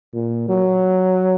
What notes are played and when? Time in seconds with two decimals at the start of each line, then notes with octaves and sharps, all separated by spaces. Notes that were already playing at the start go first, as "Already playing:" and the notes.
0.14 A#2
0.49 F#3